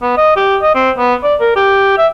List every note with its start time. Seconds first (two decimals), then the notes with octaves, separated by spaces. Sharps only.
0.02 B3
0.17 D#5
0.36 G4
0.62 D#5
0.75 C4
0.98 B3
1.23 D5
1.40 A#4
1.56 G4
1.98 E5